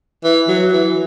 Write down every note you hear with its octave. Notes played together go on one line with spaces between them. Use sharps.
E3
F#3
E3